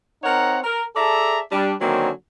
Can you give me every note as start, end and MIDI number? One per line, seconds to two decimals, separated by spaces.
0.24 0.59 60
0.24 0.59 63
0.24 0.59 70
0.24 0.59 73
0.24 0.59 78
0.24 0.59 82
0.64 0.84 70
0.96 1.39 68
0.96 1.39 69
0.96 1.39 74
0.96 1.39 76
0.96 1.39 81
0.96 1.39 82
1.52 1.74 55
1.52 1.74 62
1.81 2.10 50
1.81 2.10 51
1.81 2.10 54
1.81 2.10 58
1.81 2.10 60
1.81 2.10 61